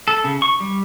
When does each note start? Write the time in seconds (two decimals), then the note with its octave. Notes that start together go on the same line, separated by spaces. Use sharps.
0.08 A4
0.24 C#3
0.42 C#6
0.60 G3